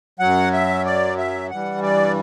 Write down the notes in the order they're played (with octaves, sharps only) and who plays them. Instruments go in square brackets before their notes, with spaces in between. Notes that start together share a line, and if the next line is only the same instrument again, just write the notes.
[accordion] F#2 F#3 F#5
E5
D5
E5
G2 E3 G3 F#5
D5